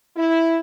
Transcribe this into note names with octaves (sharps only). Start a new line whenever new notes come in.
E4